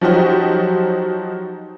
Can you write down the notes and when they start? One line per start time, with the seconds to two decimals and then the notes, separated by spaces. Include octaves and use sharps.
0.01 F3 F#3 D#4 F#4 G4 C5